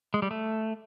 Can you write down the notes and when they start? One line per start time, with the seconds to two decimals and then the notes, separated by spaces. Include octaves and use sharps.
0.14 G#3
0.22 G3
0.31 A3